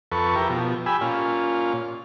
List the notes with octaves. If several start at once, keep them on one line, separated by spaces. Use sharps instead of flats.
F2 A4 B4 C#6
E4 G4 A#4
B2 F3
G4 G#5 B5 E6
A#2 C#4 F4